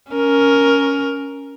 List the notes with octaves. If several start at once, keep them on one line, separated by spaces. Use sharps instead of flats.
C#4 A#4